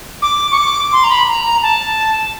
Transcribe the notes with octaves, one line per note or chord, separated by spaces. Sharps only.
D6
C#6
D6
C6
A#5
B5
A#5
A#5
A5